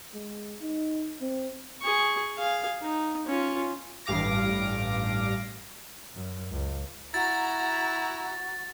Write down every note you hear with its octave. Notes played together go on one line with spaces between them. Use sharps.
G#3
D#4
C4
G#4 C#6
G#4 F5
D#4
C#4 F4
A1 G2 F5 D6 A#6
F#2
C#2
E4 F#4 A#5 A6